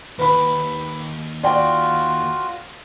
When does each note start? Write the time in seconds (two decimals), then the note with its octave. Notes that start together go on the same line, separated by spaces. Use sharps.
0.19 D#2 B4 B5
1.43 F4 F#4 D5 G5